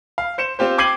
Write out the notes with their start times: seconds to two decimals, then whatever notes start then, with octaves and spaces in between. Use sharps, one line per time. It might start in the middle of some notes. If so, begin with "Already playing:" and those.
0.18 F5
0.38 C5 C#7 E7
0.59 C4 F4 G4 C5
0.78 G5 D6 G#6 C7 D#7 F#7